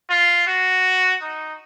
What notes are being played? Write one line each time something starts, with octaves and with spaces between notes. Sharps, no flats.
F4
F#4
D#4